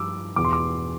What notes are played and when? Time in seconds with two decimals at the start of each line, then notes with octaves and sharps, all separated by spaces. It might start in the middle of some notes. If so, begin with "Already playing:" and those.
Already playing: G2 F3 D6 E6
0.36 E2 B2 D6
0.45 C6
0.53 D6